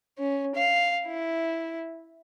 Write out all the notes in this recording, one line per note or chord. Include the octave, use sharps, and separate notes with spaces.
C#4
F5
E4